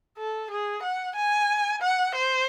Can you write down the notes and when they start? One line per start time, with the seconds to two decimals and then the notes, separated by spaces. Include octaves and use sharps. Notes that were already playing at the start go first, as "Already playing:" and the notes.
0.18 A4
0.51 G#4
0.83 F#5
1.16 G#5
1.82 F#5
2.15 C5